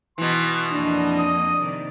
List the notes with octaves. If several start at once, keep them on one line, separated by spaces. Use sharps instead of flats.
B2 E3 C6
F2 A#3 D4 D#5
D#6
C3 D#3 D5